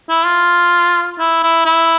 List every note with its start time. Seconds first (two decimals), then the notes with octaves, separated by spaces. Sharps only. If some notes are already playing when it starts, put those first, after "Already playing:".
0.10 E4
0.26 F4
1.19 E4
1.43 E4
1.66 E4